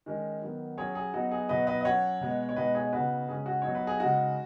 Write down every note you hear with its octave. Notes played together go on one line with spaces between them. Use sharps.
D#3 G#3 C#4
D#3 F#3 B3
F#3 C#4 G#4 C#5
G#4
F#3 B3 D#4 F#4
G#4
B2 F#3 D#4 B4 D#5
B4 D#5
D#5
F#3 C#4 C#5 F#5
B2 G#3 B3
C#5
B2 G#3 D#4 B4 D#5
G#4 C#5
C#3 B3 D#4 F#4 B4
C#3 G#3 C#4 G#4
F#4
F#3 B3 D#4 C#5
B4
G#4
C#3 G#3 D#4 F#4